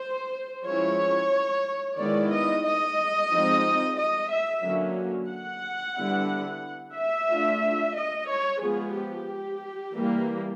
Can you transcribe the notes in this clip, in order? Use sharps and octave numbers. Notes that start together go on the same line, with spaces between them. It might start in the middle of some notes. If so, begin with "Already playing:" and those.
Already playing: C5
F3 G#3 C#4 E4 C#5
D#3 G#3 B3 E4 D5
D#5
D#5
F3 G#3 C4 D#4
D#5
E5
D3 F#3 A#3 C#4
F#5
D3 G3 B3 E4
E5
A3 D4 F4
D#5
C#5
F3 G#3 B3 G#4
G4
E3 G3 A#3